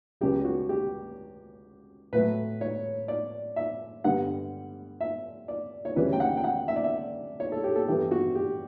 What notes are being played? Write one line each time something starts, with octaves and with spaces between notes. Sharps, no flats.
C#2 C#3 F#3 G4
F#4
G4
A2 F#3 A3 B4
C#5
D5
E5
G2 D3 G3 B3 F#5
E5
D5
C#5
D2 C#3 E3 G3 B4
G5
F#5
G5
F#5
E5
D5
E5
C#5
A4
G4
A4
G2 E3 G3 B3 G4
F#4
G4